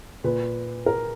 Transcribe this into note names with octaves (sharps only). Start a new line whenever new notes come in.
A#2 B4
A#4